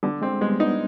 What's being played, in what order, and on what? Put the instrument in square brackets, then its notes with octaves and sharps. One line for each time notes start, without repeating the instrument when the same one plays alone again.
[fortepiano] D3 [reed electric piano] G3 B3
[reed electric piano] G#3 [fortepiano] C4
[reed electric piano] G3 B3 [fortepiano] G#3
[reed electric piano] B3 D4 [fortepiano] D#4